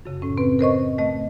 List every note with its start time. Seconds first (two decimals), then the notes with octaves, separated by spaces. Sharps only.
0.05 F#2 C#3
0.22 A2 C#4
0.38 C4 B4
0.59 A#4 C5 D#5 C#6
0.98 A3 D#5